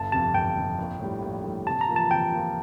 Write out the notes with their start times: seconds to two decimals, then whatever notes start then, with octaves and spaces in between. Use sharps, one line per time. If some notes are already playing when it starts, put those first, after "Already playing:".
Already playing: G1 A5
0.12 F2 C3 A5
0.34 G1 G5
0.56 F2 C3
0.78 A#1
1.00 A2 G3
1.22 A#1
1.44 A2 G3
1.67 C3 A5
1.81 A#5
1.88 F3 A#3 F4
1.96 A5
2.10 C3 G5
2.32 F3 A#3 F4